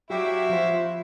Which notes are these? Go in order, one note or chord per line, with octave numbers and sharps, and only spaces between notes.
F#3 E4 F#4 G4 E5 F5
F3 F4 C5